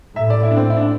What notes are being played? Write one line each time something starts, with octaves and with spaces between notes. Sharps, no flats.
A2 E5
D5
E4
D4
C4
E4
D4